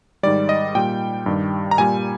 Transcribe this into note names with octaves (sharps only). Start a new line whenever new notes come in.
G#2 D#3 G3 D5
D#5
A#2 G3 G5
G2 D#3 G3
A#5
A#2 G3 G#5